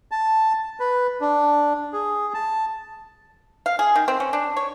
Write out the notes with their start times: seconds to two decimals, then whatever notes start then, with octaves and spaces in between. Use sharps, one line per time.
0.11 A5
0.80 B4
1.21 D4
1.93 G#4
2.34 A5
3.66 F5
3.79 G#4
3.96 D#3
4.08 C4
4.20 C#4
4.33 D4
4.57 C#5